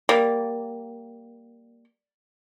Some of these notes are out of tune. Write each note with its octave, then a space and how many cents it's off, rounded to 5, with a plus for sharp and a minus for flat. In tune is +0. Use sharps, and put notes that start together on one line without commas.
G3 +0 A#3 +0